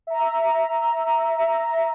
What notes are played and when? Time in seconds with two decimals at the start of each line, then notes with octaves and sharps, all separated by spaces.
0.07 E5 A#5